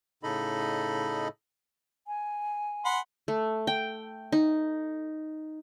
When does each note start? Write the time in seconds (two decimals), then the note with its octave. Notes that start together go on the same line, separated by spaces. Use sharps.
0.23 A2 C#3 D#4 A4 D#5 B5
2.07 G#5
2.85 F#5 B5 C6
3.28 A3
3.67 G5
4.32 D#4